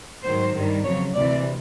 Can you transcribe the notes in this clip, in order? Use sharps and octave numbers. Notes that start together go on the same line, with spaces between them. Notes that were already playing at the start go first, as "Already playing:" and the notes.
G#2 D#3 F#3 C5
G2 D#3 G3
F2 C#3 F#3 C#5
D2 C3 E3 D5